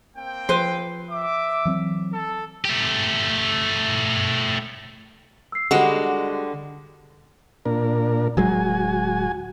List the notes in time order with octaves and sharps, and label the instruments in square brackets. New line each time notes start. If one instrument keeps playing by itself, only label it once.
[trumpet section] A#3 C4 G5
[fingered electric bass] F3 [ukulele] B4 C5
[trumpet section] E5 D6
[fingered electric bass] E3 F#3 C4
[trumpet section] A4
[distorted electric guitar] A3 G4
[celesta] E6 C7
[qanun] D3 G3 [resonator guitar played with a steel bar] G#3 F#4 [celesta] F#5
[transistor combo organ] A#2 D4 A#4
[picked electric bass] D1 F#3 G#3 [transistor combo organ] F#4 G#5